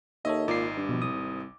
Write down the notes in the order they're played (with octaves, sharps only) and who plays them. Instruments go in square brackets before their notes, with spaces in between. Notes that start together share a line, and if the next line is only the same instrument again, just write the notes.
[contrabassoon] D#2 [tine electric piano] A4 C#5 E5 [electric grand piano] D#5
[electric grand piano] G#1 D6 [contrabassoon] A#2 [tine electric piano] D#4 C7
[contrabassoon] G2
[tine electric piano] B2 F3
[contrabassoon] C2 [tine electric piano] D#6